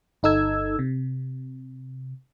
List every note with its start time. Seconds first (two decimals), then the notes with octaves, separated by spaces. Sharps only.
0.23 G1 D#4 A4 E6 G#6
0.79 C3